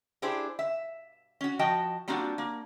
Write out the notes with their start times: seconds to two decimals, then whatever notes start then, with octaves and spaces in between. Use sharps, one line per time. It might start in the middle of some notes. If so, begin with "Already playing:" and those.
0.22 D4 E4 G4 G#4 C5
0.59 E5
1.41 C#4 F#4
1.59 F3 F#4 D#5 G5 A5
2.08 G3 A#3 C4 D4 F4 F#4
2.38 A#3